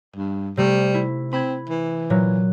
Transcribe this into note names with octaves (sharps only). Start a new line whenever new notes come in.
G2
C3 G3 A3
E4
C4 B5 G#6
E3
A#2 F#3